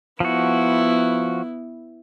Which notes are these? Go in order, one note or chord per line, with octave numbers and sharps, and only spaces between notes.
F3 B3 E4 F#4